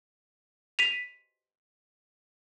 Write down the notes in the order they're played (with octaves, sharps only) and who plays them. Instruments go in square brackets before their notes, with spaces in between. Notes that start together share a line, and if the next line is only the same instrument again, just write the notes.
[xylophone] B6 D#7 F7